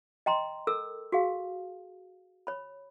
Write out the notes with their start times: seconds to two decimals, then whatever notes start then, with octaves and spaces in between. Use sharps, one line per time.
0.26 D#5 G5 A#5 C6
0.67 A4 A#4 E6
1.12 F#4 G#4 F5
2.47 C#5 B5